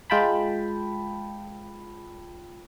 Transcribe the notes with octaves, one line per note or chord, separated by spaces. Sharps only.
G#3 F4 G5 A5 B5